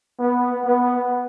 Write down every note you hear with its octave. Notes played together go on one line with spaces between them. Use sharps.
B3
B3